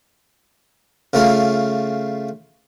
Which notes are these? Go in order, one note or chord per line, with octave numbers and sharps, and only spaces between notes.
C#3 A3 F4